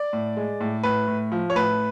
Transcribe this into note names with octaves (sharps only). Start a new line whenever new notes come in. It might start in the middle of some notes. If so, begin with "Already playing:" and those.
Already playing: D5
A2
G#3
A2
A2 B4
A2
F3
C#5
A2 B4